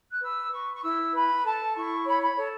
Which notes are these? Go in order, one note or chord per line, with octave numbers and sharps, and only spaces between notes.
F#6
B4 E6
B4 C#6
C#6
E4 E6
B4 B5
A4 A5
E4 C#6
C#5 B5
B5
A4 C#5